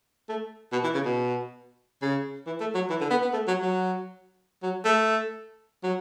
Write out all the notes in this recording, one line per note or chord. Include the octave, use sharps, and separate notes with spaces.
A3
B2
E3
C#3
B2
C#3
E3
A3
F#3
E3
D3
B3
B3
A3
F#3
F#3
F#3
A3
F#3